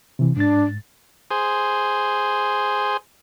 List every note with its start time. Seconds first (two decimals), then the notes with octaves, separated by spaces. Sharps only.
0.19 C3 E3
0.37 G#2 D4 A6
1.31 G#4 C5